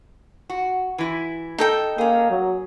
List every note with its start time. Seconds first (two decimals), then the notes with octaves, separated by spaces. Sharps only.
0.50 F#4
0.98 E3 E4
1.58 D#4 A4 G5
1.98 A#3 C#4 G#4
2.30 F#3